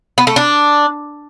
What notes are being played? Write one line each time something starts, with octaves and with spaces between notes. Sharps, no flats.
B3
A3
D4